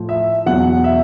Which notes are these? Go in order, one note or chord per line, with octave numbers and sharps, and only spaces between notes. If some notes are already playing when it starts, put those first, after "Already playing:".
Already playing: A2 F3
E5
E2 B2 F#3 F#5
E5